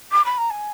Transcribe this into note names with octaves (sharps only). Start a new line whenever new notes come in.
D6
B5
A#5
G#5